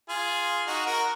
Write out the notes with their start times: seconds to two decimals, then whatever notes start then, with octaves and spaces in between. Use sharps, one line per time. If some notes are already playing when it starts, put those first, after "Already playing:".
0.09 F4 G#4
0.67 D#4 F#4
0.86 F#4 A#4